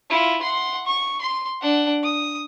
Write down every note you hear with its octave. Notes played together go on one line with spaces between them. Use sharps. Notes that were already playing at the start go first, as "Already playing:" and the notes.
E4 F4
F#5 C6
C#6
C6
D4 F#5
D#6